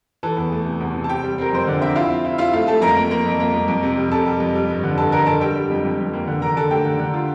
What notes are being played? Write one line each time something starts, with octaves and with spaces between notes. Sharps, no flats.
E3 A4 A5
E2
A3
C3
E2
C3
A5
C4 G4 G5
G3
C4 A#4
F2 C5
D3 D5
C4 E5
E4 F4 F5
C4
E4
E4 F4 F5
A3 F4 F5
A3 A4 A5
F2 A#4 A#5
A#3
A#3
F2
A#3
F2
F2
C3
G3
C3 A4 A5
G3
F2
G3
G2
D3
G2 A4 A5
D3 A#4 A#5
D3 A4 A5
G3 G4 G5
G3
F2
F2
F2
A#3
D3
D3 A#4 A#5
D3 A4 A5
A3 G4 G5
D3
D3
F4